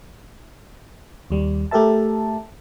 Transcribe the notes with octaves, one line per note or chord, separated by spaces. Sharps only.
D#2 G3
A3 G4 A4 A#4 E5 A5